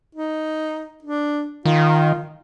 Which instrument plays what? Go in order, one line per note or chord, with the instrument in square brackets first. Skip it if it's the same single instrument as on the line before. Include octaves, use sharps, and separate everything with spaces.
[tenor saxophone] D#4
D4
[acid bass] D#3 [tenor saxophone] F4